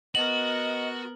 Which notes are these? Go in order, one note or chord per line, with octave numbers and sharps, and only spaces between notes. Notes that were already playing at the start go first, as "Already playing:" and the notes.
B3 F#4 A#4 D#5 F#7